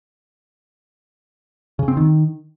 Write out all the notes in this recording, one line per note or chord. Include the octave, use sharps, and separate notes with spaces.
C#3
C4
D#3